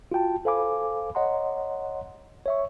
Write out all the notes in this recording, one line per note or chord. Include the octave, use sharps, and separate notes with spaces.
F4 F#4 G5 A5
A4 C5 F5 G#5 B5 D6
C#5 D#5 F#5 A#5 C6
C#5 E5 C#6